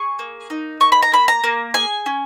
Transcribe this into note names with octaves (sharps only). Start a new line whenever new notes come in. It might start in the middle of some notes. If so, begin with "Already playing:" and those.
Already playing: G#4 C#6
A#3
D#4
A#3 C#6
B5
A#5
A#3 B5
A#5
A#3
G#4 G#5
C#4